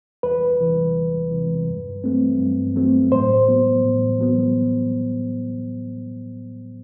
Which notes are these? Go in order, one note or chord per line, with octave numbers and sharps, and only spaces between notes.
E2 B4
C3 E3
E2
C3 E3
G2
F#3 A3 C4
G2
F#3 A3 C4
A2 C5
F#3 B3
A2
F#3 B3